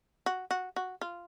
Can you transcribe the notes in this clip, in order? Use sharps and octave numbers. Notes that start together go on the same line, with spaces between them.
F#4
F#4
F#4
F4